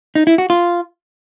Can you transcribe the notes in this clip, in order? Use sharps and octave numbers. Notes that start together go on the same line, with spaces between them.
D#4
E4
F#4
F4